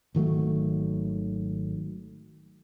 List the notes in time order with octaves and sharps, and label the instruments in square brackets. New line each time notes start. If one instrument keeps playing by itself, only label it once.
[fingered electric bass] G#1 D#3 F#3 A3